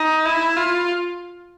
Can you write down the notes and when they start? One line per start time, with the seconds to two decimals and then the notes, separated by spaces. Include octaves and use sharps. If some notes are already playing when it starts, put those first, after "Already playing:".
Already playing: D#4
0.26 E4
0.57 F4